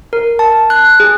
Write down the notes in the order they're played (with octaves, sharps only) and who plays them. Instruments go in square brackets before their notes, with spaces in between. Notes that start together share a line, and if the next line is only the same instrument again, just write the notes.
[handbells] A#4
A5
F#6
G#4